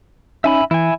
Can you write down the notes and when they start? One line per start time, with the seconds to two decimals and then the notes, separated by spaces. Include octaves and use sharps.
0.44 C#4 D#4 E5 G#5 B5
0.71 E3 E4 G#5